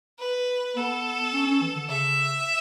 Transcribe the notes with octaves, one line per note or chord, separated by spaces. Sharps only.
B4
B3 A4
C#4
C#4
E3
D3
C#3 E5